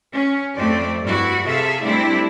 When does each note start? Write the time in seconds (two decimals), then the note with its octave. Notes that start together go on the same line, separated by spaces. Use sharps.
0.12 C#4
0.56 F2 A3 C4 D5
1.02 G2 E4 F#4
1.46 C3 G#4 A4 E5 F5
1.83 G3 A3 C4 D4 E4